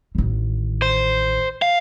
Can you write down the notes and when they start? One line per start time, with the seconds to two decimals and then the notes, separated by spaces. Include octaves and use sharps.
0.15 A1 D#3
0.82 C5
1.62 F5